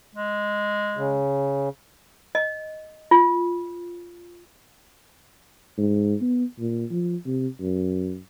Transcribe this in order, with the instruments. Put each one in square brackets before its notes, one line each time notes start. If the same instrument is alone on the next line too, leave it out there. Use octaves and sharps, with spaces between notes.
[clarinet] G#3
[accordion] C#3
[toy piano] D#5
F4
[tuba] G#2
B3
A#2
F3
C3
F#2